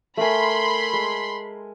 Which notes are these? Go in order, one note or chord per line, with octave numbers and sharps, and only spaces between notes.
A3 A#4 G#5 B5 C6
G#3